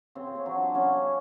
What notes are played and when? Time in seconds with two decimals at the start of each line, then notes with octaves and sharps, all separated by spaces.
0.15 C#3 C4
0.35 C#4
0.46 F#3
0.55 D4
0.74 C#3 C#4